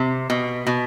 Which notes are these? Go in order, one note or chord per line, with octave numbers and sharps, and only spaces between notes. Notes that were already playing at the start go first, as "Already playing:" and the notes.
Already playing: C3
B2
B2